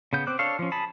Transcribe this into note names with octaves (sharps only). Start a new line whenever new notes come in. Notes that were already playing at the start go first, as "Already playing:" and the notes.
C#3 B3 G6
C4 C5 D6 F#6
D4 A4 C#5 F5
F3 C#4
G#4 A5 B5